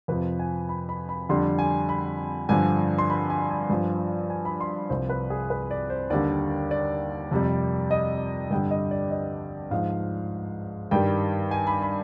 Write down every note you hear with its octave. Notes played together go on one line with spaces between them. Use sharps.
F2 C3 F3 B4
G#5
B5
B5
B5
F2 D3 G3 C6
G#5
B5
G2 D3 F3 G#5
C6
B5
G#5
G#5
G2 F3
G#5
B5
C6
C2 C3 F3 C5
B4
G#4
B4
D5
C5
D#2 D3 G3 D5
D5
F2 C3 G3
D#5
G2 D3 G3 G5
D#5
D5
D#5
G#2 F3 F5
G2 D#3 G3 G5
G#5
B5
B5